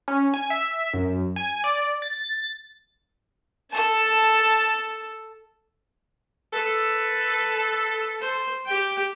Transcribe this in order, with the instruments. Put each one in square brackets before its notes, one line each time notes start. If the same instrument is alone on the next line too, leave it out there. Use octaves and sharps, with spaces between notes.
[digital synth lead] C#4
G#5
E5
F#2
G#5
D5
A6
[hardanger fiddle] A4 A5
[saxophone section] A4 [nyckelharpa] B4
[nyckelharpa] C5
G4 G5